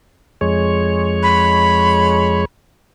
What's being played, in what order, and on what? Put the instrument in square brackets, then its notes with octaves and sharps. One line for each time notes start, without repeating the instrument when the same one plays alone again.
[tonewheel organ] F2 G#3 C#5
[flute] B5